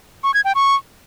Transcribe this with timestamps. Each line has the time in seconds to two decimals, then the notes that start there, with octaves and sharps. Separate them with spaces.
0.24 C#6
0.34 G#6
0.45 G5
0.55 C#6